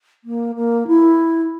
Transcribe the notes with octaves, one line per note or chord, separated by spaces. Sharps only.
A#3
A#3
E4